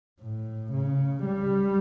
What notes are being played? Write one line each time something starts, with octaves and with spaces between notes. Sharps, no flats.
A2
C#3
G3